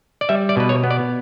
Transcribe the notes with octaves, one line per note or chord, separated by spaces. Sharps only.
D5
G3 E5
D5
B2 B4
C#5
B3
D5